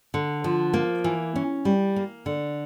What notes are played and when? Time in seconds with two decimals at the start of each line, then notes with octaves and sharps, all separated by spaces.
0.14 D3
0.44 F3
0.73 A#3
1.04 E3
1.35 C#4
1.65 G3
1.96 A#3
2.26 D3